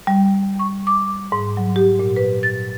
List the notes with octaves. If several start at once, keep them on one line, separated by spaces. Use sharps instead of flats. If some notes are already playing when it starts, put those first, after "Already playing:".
G3
C#6
D6
G#2
F#3
G4
A#2
B4
A6